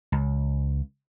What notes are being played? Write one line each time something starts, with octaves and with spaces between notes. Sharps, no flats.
C#2